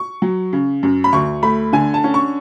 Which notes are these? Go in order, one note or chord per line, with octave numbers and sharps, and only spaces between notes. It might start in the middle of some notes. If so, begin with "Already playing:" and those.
Already playing: C#6
F#3
C#3
F#2
B5
D2 C#6
A3 B5
D3 G#5
A5
C#4
C#6